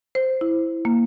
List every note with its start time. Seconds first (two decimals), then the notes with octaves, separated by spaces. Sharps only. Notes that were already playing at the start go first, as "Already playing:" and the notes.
0.15 C5
0.41 E4
0.85 A#3